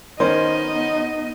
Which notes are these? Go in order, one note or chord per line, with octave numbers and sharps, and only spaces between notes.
D#3 B3 C#4 D#4 C5 D#5